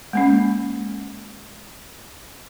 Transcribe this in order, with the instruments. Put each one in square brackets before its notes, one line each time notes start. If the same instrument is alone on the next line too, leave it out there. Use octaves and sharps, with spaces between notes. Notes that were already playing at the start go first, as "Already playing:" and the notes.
[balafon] G#3 A#3 C#4